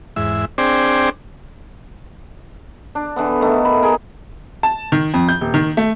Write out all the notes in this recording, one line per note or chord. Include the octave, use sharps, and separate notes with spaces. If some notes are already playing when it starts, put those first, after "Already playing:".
E2 G#2 E5
C4 D4 G#4 C5 D5 G5
D4
D3 E3 B3
D#3 A3
B5
G#4 A#4
A5
D#3
F2
G6
D#1
D#3
A3